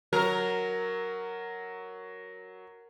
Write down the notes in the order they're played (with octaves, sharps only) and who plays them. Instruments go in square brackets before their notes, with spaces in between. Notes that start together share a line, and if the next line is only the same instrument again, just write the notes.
[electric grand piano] F#3 [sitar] A#4